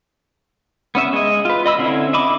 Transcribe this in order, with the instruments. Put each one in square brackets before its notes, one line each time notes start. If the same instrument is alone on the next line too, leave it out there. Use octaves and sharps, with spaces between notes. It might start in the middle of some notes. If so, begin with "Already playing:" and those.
[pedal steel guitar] B3 C#4 E5
G#3 D#5
F4 B4
D#5 B5 E6
D3 C4 C#4 E4
D#5 E5 B5 D6